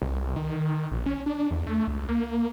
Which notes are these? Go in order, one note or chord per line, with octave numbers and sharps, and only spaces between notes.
C2
D#3
A#1
C#4
D4
E2
A3
C#2
A#3